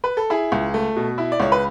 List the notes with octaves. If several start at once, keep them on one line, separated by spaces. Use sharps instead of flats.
B4
A4
E4 G#4
C#2
A3
B2
E4
D5
C#2 C#5
B4